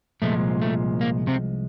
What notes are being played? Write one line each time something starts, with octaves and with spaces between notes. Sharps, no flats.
C2 A#2 F3 G#3 A3
A3
A#3
C3 C4